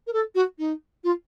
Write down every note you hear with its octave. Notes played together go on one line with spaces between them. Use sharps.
A#4
A4
F#4
D#4
F4